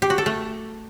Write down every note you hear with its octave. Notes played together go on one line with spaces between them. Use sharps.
G4
F#4
A4
A3